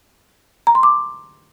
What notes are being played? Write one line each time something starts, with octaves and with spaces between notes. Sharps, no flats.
A#5
C6
D6